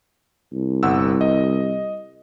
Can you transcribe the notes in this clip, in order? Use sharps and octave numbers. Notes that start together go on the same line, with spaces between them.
C2
G1 F#5 E6
D#5